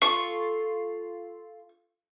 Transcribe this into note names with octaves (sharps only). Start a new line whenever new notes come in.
F4 A4 C#6